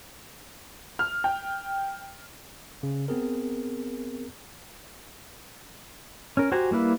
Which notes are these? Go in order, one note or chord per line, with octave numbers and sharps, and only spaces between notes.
F6
G5
C#3
B3 C4 G#4 A#4
C#4 A#4
F#4 G4 C5 G#5 A#5
G3 A#3 E4 B4